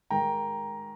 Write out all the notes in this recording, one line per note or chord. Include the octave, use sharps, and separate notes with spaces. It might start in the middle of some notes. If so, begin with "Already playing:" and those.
D#3 G#3 G5 A#5